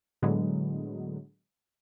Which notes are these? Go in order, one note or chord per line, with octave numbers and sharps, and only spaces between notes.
A2 D3 F#3 G#3 B3